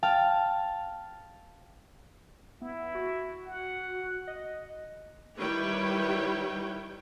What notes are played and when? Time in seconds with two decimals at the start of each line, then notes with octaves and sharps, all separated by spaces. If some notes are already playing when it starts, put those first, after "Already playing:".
0.03 F5 G5 A5 F6
2.62 B3 E4
2.95 F#4
3.45 F#5
4.27 D#5
5.38 D#3 G3 E4 B4 C#5 G5